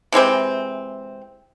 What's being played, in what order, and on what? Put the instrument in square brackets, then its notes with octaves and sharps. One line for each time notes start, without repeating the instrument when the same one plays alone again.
[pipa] C3 E3 G#3 C4